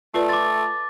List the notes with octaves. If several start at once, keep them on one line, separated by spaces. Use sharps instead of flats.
A3 F4 B4 D5
C6 D6 A6